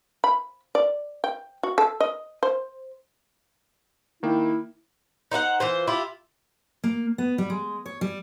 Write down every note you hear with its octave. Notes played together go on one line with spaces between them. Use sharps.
B5
D5
G5
F#4
A4
D#5
C5
D#3 A#3 E4 G5
D#4 C5 F5 F#5
E3 F4 C5
E4 F4 G4
A#3
B3
G3
G#3
C#5
G3